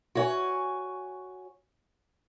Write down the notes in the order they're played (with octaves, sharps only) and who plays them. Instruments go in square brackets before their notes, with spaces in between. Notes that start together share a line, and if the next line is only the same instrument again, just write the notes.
[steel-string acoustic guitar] F#4 C#5 G#5